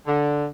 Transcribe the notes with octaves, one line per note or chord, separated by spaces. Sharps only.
D3